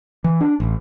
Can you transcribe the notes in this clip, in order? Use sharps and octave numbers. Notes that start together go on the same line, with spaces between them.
E3
D4
A1